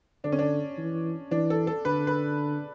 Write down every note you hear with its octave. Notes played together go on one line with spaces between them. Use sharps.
D3 D4
C#4
D4
E3
E3 D4
A4
A4
D3 B4
B4